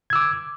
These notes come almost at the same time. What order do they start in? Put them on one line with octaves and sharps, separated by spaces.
G#6 E6 D6